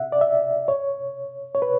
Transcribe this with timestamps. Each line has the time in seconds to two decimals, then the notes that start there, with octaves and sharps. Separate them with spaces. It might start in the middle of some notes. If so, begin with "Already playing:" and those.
Already playing: E5 F#5
0.12 D5
0.21 E5
0.68 C#5
1.55 C#5
1.62 B4